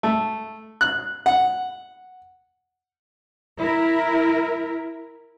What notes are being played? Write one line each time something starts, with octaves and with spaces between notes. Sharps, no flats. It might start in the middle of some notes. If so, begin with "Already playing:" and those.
A3
F#6
F#5
E4 A#4